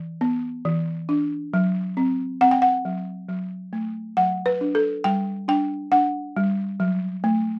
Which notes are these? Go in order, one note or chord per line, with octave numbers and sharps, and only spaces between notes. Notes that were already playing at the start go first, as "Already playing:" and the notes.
Already playing: E3
B3
E3
D4
F#3
C4
C4 F#5
G5
F#5
F#3
F#3
A3
F#3 F#5
B4
D4
A4
G3 G5
D4 G5
D4 F#5
G3
F#3
A3